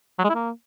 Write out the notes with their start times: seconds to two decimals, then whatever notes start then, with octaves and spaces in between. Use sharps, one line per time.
0.19 F#3
0.24 G#3
0.29 E4
0.35 A#3